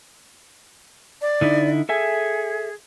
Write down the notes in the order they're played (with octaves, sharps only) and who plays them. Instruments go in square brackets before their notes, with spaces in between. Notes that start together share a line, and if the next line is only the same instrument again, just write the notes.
[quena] D5
[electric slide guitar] D3 D#4 E4
[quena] G#4 [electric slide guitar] A4 E5 G#5